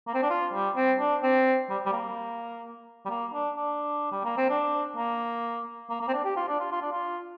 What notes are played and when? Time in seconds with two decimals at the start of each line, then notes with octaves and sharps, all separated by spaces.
0.07 A#3
0.14 C4
0.22 D4
0.30 F4
0.53 G3
0.76 C4
0.99 D4
1.23 C4
1.70 G3
1.86 G3
1.93 A#3
3.05 G3
3.09 A#3
3.33 D4
3.56 D4
4.12 G3
4.24 A#3
4.37 C4
4.49 D4
4.97 A#3
5.90 A#3
6.01 A#3
6.08 C4
6.14 D4
6.25 G4
6.36 F4
6.48 D4
6.60 F4
6.72 F4
6.82 D4
6.92 F4